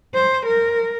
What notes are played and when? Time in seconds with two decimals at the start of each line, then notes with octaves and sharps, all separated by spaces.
0.14 C5
0.46 A#4